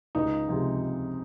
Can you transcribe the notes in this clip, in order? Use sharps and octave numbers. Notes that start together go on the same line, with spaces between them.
C#2 D#4
C3 F3 G#3